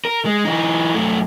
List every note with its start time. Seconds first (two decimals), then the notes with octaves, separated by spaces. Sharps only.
0.05 A#4
0.25 G#3
0.45 E3 D#4
0.94 F#2 A3